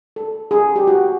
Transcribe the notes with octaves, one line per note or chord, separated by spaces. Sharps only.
A4
G#4
G4
F#4